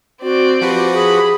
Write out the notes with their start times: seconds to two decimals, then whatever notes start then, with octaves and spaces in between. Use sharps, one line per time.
0.23 C4 F#4 D5
0.61 F3 F#4 G4 B4
0.94 G#4 B5